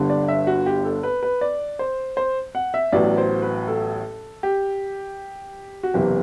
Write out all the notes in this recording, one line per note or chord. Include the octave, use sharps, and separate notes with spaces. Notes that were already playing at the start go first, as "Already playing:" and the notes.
Already playing: G1 G2 D3
D5
E5
F#4
G4
A4
B4
B4
D5
C5
C5
F#5
E5
A1 A2 F#3 B3 D5
C5
B4
A4
G4
F#4
F#1 E2 C3 E3 G4